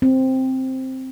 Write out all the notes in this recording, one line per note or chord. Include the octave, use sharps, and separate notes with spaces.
C4